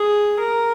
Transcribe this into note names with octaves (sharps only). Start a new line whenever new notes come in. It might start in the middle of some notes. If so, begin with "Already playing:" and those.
Already playing: G#4
A#4